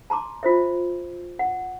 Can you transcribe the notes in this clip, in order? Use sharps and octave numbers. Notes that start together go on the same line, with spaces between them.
A5 A#5 C6 D6
F4 C5 E5
F#5